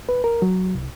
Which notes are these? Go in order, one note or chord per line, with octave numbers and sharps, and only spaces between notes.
B4
A#4
F#3
C2